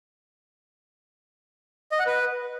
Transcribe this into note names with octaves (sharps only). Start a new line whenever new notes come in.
D#5
F#5
B4